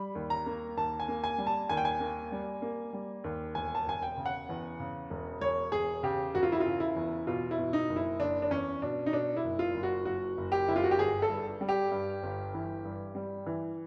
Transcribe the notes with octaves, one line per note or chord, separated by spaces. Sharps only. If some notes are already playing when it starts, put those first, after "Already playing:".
Already playing: G3 B5
D#2
A#5
A#3
D#2 A5
G#5
A#3
G#5
G3
A5
D#2 G#5
G5
G#5
A#3
G3
A#3
G3
D#2
E1 G#5
A5
E1 G#5
G5
C#3
F#5
E2
C#3
E1
E1 C#5
E1 G#4
C#3 G4
E1 F#4
F4
E4
C#3 F4
E4
E2
B2 F4
E4
B2
D#4
F#1
E4
F#1 D4
D4
E2 C#4
B2 D4
D#4
B2 D4
E4
F#1
F4
F#1
F#4
F#1 F#4
F#1
G4
F#1 E4
F4
F#4
G4
G1 G#4
A4
G2
G3
G4
G2
G1
E3
G2
G3
E3